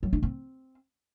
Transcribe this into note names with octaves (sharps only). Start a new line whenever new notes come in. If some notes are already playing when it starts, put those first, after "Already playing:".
F#3
D4
C4